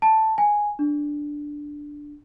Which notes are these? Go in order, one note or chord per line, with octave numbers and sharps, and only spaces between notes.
A5
G#5
D4